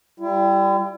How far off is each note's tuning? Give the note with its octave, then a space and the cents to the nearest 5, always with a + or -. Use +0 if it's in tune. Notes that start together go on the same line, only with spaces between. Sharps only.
G3 -5 E4 +40